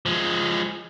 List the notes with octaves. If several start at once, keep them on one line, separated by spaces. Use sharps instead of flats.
F3 G#3